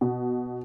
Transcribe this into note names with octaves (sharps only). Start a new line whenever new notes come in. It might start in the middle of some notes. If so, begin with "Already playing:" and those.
B2